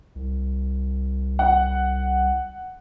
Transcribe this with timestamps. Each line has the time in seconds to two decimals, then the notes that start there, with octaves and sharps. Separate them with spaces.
0.15 C2
1.39 F#5